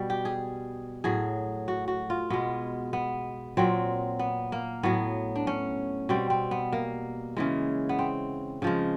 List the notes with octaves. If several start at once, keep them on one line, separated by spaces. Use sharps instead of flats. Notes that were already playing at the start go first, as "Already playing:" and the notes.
Already playing: B2 G3
G4
G#4
A2 F#3 G#4
F#4
F#4
F4
B2 G#3 B3
B3
A#2 F#3 C4
B3
A#3
A2 F#3 B3
D4
C#4
B2 G3 C4
C4
B3
A#3
C#3 E3 G#3
B3
C4
C#3 F3 G#3